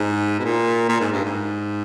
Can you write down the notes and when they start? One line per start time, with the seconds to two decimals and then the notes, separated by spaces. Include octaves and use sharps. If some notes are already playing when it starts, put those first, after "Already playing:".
Already playing: G#2
0.39 B2
0.44 A#2
0.89 A#2
1.00 G#2
1.12 G2
1.25 G#2